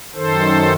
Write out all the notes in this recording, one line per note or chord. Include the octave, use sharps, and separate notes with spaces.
F#2 D#3 A4 C5